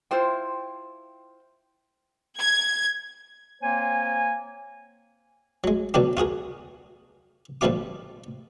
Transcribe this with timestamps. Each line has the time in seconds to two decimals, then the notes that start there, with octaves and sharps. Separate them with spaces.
0.11 E4 F4 C5 G5
2.39 G#6
3.62 A#3 C4 C5 C#5 G#5
5.64 F#3 G#3
5.94 B2 D3 F#3 D4 G4
6.17 F4 F#4 G#4 A#4
7.61 A#2 D3 F3 G3 F4 D6